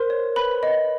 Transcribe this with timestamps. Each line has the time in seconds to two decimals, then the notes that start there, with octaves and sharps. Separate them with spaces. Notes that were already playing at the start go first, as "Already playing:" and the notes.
Already playing: A#4 C5 C6
0.10 C#5
0.36 B4 B5
0.63 D#5